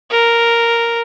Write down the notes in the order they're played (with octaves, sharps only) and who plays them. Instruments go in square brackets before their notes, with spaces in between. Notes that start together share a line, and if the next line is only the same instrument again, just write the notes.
[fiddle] A#4